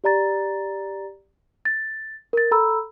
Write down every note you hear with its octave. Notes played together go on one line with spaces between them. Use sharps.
G4 D5 A#5 A6
A6
A#4 A6
A4 A#5 B5 E6